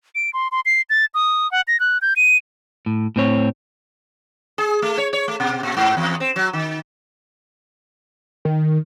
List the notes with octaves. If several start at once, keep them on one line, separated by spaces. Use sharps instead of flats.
D7
C6
C6
C7
A6
D#6
F#5
A#6
F#6
G6
D#7
A2
A2 C4 C#5
G#4
A3
C#5
C#5
A3
B2
A#2
G#2
E2
C4
F#3
D#3
D#3